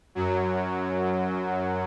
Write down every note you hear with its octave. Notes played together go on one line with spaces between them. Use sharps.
F#2 F#3